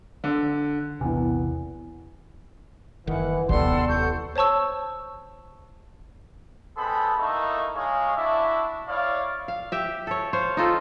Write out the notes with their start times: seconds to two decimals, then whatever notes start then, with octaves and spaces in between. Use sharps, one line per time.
0.24 D3
1.01 A#1 E2 C3 B3 E4 G#5
3.07 F#1 D#3 E3 F#5
3.49 D#1 D#2 C3 G3 B3 A4 F#5 C6
3.88 A1 A4 F#5 C#6 G6
4.36 C5 C#5 A5 C#6 E6
6.77 G#3 B3 C4 A4 B5
7.18 A3 A#3 D#4 E4 A4 C#6
7.74 G#3 C#5 F5
8.16 D4 E4 F#4 E5 A5
8.88 E4 C#5 D5 F5
9.48 F5
9.72 G4 E5
10.07 A4 C#5
10.33 C5 C#5 F5
10.57 D#4 F4 A4